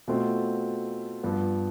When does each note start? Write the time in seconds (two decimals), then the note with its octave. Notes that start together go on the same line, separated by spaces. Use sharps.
0.08 B2 A3 C4 F4
1.23 G2 F3 B3